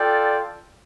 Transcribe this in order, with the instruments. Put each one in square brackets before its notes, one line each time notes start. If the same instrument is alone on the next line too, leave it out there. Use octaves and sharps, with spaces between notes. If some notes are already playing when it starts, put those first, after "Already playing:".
Already playing: [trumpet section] F4 A4 D5 G5